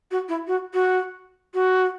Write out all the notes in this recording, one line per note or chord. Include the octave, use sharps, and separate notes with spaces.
F#4
E4
F#4
F#4
F#4